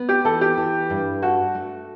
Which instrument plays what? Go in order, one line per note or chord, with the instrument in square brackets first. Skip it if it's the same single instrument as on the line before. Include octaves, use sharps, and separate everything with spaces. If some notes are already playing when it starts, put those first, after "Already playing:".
Already playing: [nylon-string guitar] B3
[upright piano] G4
[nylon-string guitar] E3 [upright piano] A4
[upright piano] G4
[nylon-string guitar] E3
G2
[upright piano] F#4 [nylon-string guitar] A4
[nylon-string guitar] A3